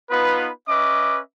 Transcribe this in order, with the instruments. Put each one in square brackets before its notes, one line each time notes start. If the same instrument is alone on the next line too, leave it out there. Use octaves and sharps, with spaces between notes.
[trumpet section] B3 D#4 F4 B4
C#4 B4 D#5 E5 D6